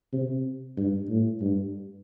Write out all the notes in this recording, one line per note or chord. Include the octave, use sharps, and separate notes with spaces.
C3
G2
A2
G2